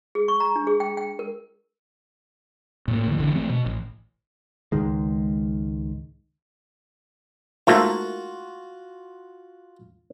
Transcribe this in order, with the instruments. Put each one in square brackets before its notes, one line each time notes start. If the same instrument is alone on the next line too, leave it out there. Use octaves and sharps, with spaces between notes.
[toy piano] G#4
C#6
A#5
D4
G#4
G5
G5
A#4
[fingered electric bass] A2 A#3
D2 E3
G#1 D3 E3
E3 A3 C4
B2
A1
[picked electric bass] C#2 G#2 D#3 G#3
[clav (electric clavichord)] G#2 A3 A#3 [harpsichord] F4 F#4 C#6